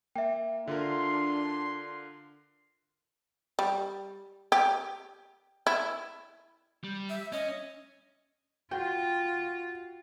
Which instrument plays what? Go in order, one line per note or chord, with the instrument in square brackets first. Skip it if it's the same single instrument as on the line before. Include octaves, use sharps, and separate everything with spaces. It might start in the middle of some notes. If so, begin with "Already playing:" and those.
[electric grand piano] A#3 [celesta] E5 G5
[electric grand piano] D3 F4 A#4 [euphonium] D4 [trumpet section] C6
[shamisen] G3
G4
E4
[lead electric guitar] G3
[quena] E5
[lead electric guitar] C#4 [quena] D#5
[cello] F4 [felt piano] F#4 [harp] G5